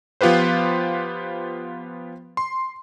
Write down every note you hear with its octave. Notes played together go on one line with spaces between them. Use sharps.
F3 B3 F4 G4 B4 C5
C6